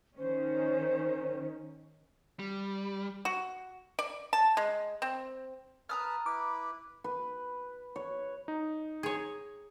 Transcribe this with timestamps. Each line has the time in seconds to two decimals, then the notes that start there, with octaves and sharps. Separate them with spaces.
0.18 D#3 C#4 C5
2.39 G3
3.25 F#4
3.99 D5
4.33 A5
4.57 G#3
5.02 C4
5.89 B4 A5 A#5 D#6 F6
6.26 E4 B4 D6
7.04 B4
7.96 C#5
8.48 D#4
9.03 G#4 C#5